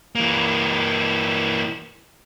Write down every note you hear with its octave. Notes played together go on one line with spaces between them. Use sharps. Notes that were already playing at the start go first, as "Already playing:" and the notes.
E3 A#3